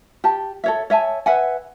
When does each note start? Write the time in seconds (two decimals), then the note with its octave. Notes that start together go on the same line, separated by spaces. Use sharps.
0.24 G4 A5
0.64 A4 C#5 E5
0.90 C#5 E5 G#5 A5
1.26 B4 E5 F#5 G#5